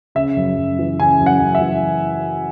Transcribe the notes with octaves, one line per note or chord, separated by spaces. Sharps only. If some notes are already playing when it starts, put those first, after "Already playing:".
C#3 E5
F#2
F#2
E3
C#3 G#5
F#2
F#5
F#2
E5
E3